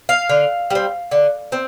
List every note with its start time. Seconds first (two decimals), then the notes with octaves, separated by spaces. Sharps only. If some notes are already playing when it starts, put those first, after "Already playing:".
0.09 F5
0.29 D3
0.70 G3 C4
1.11 D3
1.52 C4